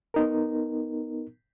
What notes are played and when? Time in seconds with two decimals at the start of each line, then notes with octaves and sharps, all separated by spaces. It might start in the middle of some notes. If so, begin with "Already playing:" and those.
0.14 B3 D#4 A#4